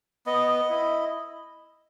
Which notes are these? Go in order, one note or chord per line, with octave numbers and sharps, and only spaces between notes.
B3 D#5
E4